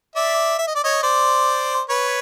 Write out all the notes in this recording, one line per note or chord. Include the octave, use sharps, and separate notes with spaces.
D5 E5
E5
D#5
D5
C#5 D#5
C5 D5
B4 C#5